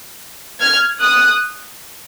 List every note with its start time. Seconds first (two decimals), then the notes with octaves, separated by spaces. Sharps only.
0.60 F6 G#6
1.00 D#6 F#6